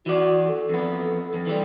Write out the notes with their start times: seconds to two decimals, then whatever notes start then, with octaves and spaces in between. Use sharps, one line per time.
0.06 E3 F#4 D5
0.48 A4
0.69 F2 B3
1.34 F2
1.46 E3 G3